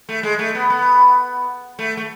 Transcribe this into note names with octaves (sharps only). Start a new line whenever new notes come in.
A3
G#3
A3
B3
B3
A3
A3